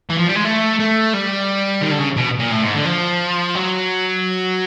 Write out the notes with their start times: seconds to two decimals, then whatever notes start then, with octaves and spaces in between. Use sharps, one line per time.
0.10 E3
0.19 F3
0.27 G3
0.36 G#3
0.45 A3
0.80 A3
1.14 G3
1.82 D#3
1.92 D3
2.00 C#3
2.17 B2
2.40 A#2
2.52 A2
2.63 G#2
2.75 D3
2.86 F3
3.55 F#3